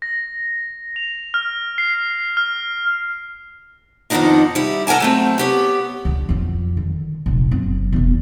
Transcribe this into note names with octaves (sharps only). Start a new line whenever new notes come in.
A#6
F7
F6
C7
F6
F2 D#3 B3 C4 D4 D#4
G3 E4
A4 A#4 F#5 G#5 A5
F#3 A3 C4
B3 G4 C#5
C#2 D3
F2 F4
D3 D#3
F1 A#1
F#1 C4
E1 E2